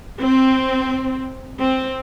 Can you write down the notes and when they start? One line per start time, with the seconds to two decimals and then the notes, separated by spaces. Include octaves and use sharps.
0.20 C4
1.58 C4